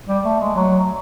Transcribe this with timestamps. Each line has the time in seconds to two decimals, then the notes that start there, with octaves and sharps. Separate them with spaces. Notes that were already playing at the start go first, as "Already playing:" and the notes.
0.09 G3
0.25 A3
0.40 G#3
0.56 F#3